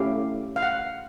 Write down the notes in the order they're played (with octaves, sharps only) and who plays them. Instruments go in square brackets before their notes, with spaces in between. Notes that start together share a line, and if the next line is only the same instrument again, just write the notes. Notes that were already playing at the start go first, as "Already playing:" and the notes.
Already playing: [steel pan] A3 C#4 E4 G4 F5
F5
F#5